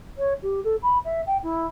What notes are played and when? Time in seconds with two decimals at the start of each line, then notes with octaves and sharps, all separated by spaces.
0.18 C#5
0.43 G4
0.64 A4
0.82 B5
1.05 E5
1.26 G5
1.43 E4